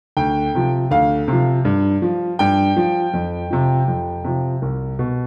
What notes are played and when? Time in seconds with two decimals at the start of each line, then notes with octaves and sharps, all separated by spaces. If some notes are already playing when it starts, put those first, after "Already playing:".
0.17 D2 G5
0.55 C3 F3
0.91 D2 F5
1.28 C3 F3
1.65 G2
2.02 F3
2.39 G2 G5
2.77 F3
3.14 F2
3.51 C3 F3
3.88 F2
4.24 C3 F3
4.62 C2
4.99 B2